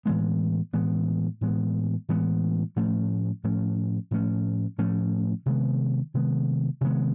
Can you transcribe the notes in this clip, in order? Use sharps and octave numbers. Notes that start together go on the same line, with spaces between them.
A2 E3 G#3 B3
A2 E3 G#3 B3
A2 E3 G#3 B3
A2 E3 G#3 B3
A2 F3 A3 C#4
A2 F3 A3 C#4
A2 F3 A3 C#4
A2 F3 A3 C#4
C3 D#3 G#3 B3
C3 D#3 G#3 B3
C3 D#3 G#3 B3